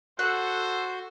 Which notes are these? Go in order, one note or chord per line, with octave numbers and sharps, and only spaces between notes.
F#4 A4 C5 F#5